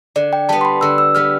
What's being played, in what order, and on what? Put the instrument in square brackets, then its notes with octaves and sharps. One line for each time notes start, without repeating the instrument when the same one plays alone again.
[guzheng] D3 [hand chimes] D5
[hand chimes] G5
[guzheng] G3 B3 [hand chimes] A5
[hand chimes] C6
B5
[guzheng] D3 [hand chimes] E6
[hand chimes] E6
[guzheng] G3 B3 [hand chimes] F6